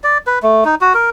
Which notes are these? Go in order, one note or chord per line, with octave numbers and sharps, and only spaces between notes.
D5
B4
A3
D#4
F#4
A#4